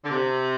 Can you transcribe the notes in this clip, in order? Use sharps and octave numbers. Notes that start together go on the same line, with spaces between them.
D3
C3